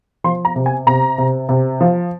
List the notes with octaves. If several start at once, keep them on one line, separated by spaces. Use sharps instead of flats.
F3 C6
A#5
C3
G#5
C3 A#5
C3
C3
F3